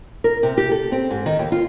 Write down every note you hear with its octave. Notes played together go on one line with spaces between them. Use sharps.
A#4
C3
G4
A4
C4
G#2
D#3
D#2
F4